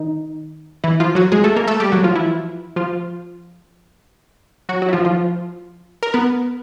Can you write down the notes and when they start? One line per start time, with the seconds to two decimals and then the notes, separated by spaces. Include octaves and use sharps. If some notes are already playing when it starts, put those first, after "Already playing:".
Already playing: D#3 D#4
0.84 E3 E4
1.00 F3 F4
1.15 F#3 F#4
1.32 G#3 G#4
1.44 A3 A4
1.56 A#3 A#4
1.67 A3 A4
1.80 G3 G4
1.92 F#3 F#4
2.03 F3 F4
2.16 E3 E4
2.76 F3 F4
4.69 F#3 F#4
4.82 F#3 F#4
4.89 E4
4.93 F3 F4
5.05 F3 F4
6.03 A#4
6.14 B3 B4